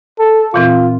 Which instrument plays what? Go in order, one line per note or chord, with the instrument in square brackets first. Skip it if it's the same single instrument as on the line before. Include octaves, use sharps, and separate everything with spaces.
[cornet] A4
[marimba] A#2 E3 C4 [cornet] F4